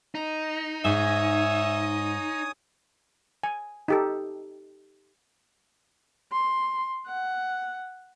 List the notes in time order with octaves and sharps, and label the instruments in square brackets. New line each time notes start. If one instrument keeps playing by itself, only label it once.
[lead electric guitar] D#4 [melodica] A#5
[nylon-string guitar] G#2 [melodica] C#5 G#5 D#6 [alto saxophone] E5
[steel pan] G#5
D#4 G4 A4
[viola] C6
F#5